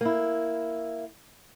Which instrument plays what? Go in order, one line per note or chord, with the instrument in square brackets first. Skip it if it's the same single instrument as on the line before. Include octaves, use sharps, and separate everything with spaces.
[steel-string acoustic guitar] A#3 E4